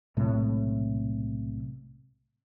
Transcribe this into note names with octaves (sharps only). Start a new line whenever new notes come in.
B1 A2 C3 G#3